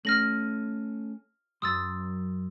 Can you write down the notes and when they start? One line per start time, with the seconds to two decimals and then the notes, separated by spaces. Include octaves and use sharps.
0.05 A3 C#4 A4 F6 A#6 F#7
1.62 F#2 F#3 C6 D#6 E6 A6